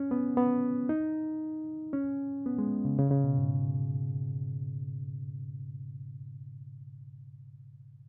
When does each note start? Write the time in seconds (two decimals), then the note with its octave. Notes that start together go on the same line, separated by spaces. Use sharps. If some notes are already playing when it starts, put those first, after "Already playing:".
Already playing: C#4
0.11 B3
0.37 B3
0.89 D#4
1.93 C#4
2.46 B3
2.58 G#3
2.85 C#3
2.98 C#3
3.11 C#3
3.24 B2
3.37 G#2